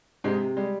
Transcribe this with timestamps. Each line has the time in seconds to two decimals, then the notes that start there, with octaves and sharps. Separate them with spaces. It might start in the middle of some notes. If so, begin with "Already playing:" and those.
0.24 G#2 C3 G#3
0.40 C3
0.56 G3 G#3